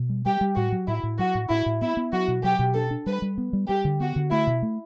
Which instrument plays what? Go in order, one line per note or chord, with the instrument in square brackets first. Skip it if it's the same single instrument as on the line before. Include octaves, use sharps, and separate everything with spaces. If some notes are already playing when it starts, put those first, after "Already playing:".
Already playing: [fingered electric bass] B2
G3
[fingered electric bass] G3 [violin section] G4
[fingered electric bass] G3
[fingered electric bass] A2 [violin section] F#4
[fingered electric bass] F#3
[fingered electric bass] A2 [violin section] E4
[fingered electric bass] A2
[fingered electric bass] F#3 [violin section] F#4
[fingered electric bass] A2
[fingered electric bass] A2 [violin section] E4
[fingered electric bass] A2
[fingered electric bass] B3 [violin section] E4
[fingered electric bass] B3
[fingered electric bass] F#3 [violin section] F#4
[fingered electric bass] B2
[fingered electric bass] F#3 [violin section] G4
[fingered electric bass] B2
[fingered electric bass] D4 [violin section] A4
[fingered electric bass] D4
[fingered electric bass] G3 [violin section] B4
[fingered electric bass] G3
B3
G3
[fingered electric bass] G3 [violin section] G4
[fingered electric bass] D3
[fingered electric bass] B3 [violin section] F#4
[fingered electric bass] D3
[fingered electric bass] A3 [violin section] E4
[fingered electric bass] B2
A3